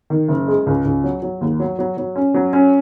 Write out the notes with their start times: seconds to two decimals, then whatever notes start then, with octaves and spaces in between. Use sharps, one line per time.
0.10 D#3
0.29 F#1
0.48 G#3
0.66 C#2
0.85 C#2
1.04 F#3
1.23 F#3
1.41 D#2
1.60 F#3
1.79 F#3
1.97 F#3
2.16 C#4
2.34 F#3
2.53 C#4